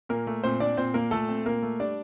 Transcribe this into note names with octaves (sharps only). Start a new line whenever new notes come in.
A#2 A#3 A#4
A3
A#2 C4 C5
C4 D4 D5
A#2 C4 C5
A#2 A#3 A#4
A#2 A3 A4
C4
A#2 A#3 A#4
A3
G3 D4 D5